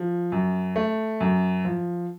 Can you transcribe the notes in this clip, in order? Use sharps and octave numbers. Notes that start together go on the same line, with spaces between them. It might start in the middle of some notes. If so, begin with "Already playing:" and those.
Already playing: F3
F#2
A3
F#2
F3